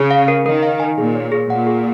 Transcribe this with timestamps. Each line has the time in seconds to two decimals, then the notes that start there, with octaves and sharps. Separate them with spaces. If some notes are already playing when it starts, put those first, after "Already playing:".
Already playing: C#3
0.11 F5
0.28 A#4
0.45 D#3 A#4
0.63 F5
0.80 G#5
0.98 A#2 G#4
1.15 C#5
1.32 G#4
1.50 A#2 F#5
1.67 G#4